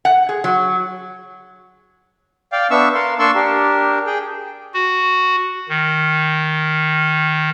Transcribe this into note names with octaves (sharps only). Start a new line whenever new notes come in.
F#5
G#4
F#3
D5 F5 G5
B3 D4 E5 C#6 E6
A#4 F5 C6
A#3 D4 D5 C6 C#6 E6
D4 G4 A#4
G#4 G5
F#4
D#3